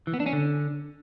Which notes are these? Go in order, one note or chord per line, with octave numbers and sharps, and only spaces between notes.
E3
B3
D4
C#4
D3